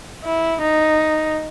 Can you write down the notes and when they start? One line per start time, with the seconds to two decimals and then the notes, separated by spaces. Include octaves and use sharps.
0.24 E4
0.62 D#4